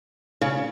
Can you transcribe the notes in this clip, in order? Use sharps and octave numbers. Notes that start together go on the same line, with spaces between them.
C#3